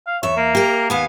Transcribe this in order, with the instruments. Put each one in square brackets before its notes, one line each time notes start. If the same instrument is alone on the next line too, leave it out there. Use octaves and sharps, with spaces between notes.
[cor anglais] F5
[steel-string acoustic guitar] E2 E5 [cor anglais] C#5
[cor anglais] A#3
[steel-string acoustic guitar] G4 A#4
[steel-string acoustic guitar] D#2 F5 G#5 [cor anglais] B3